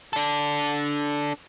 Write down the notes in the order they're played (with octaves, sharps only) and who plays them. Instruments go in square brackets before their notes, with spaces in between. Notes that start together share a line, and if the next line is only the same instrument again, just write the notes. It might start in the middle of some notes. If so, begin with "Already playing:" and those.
[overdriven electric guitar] D4 A4